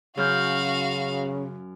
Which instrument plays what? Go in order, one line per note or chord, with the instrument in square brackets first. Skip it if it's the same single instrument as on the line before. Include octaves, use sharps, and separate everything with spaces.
[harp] F#2 F6 G6 [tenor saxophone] C#3 [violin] F#4 F5